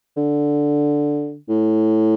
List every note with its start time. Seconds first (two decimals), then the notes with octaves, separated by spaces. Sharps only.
0.17 D3
1.49 A2